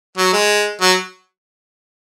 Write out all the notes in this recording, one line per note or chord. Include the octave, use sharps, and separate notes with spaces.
F#3
G#3
F#3